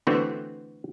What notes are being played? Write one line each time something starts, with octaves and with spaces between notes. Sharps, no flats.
D3 E3 A3 B3 C4 F#4